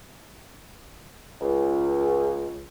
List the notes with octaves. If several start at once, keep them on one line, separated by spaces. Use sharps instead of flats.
C#2